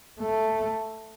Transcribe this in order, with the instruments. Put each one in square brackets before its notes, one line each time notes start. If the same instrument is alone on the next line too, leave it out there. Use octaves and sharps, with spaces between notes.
[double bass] A3